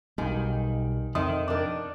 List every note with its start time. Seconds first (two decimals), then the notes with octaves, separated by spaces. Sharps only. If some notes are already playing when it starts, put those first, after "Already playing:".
0.18 B1 D#3 G3 G#5
1.15 F2 D#3 E5 C6 D#6
1.48 D#3 D4 A#4 D6